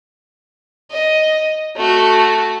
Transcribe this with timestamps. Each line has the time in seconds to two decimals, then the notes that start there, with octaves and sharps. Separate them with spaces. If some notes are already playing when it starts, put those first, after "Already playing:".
0.92 D#5
1.77 A3 F#4